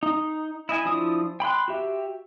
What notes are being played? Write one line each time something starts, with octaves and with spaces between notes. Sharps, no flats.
D#4
E4 D#5 G#5
F3 D4 E4 D#6
G5 B5 C6 F#6
F#4 G4 E5